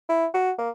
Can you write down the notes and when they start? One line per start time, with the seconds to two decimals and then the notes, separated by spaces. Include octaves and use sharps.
0.09 E4
0.34 F#4
0.58 A#3